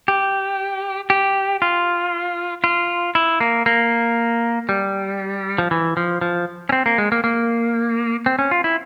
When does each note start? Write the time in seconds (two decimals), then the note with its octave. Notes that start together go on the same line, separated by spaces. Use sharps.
0.08 G4
1.10 G4
1.62 F4
2.64 F4
3.15 E4
3.40 A#3
3.66 A#3
4.69 G3
5.58 F3
5.71 E3
5.97 F3
6.21 F3
6.69 C#4
6.72 C4
6.86 A#3
6.98 G#3
7.12 A#3
7.24 A#3
8.26 C4
8.39 C#4
8.51 F4
8.64 E4